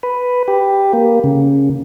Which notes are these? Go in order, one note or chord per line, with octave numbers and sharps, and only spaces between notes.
B4
G4
A#3
C#3